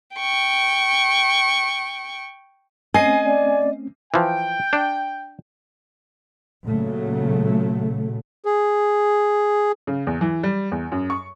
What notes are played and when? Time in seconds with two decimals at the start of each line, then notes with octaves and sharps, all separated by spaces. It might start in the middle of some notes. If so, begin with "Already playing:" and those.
0.16 G5 C#6
2.94 A3 C4 C#4 D#5 G#5 C7
3.26 D5
4.14 E3 F3 G5
4.73 D4
6.66 A#2 C#3 F#3 A3
8.45 G#4
9.87 C#3
10.07 E2
10.21 E3
10.43 G3
10.72 E2
10.92 F#2
11.10 C#6